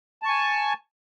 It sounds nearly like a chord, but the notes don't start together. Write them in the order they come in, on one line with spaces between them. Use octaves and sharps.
A5 C#6 G#5